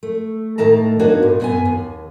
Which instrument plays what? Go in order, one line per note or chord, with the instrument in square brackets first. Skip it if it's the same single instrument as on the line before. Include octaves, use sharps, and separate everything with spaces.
[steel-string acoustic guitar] A3
A2 D#3 A3 A5 A#5
A#3 B3 D4 D#4 F#4 C#5
G2 A#2
F#2 B3 G#5
D#2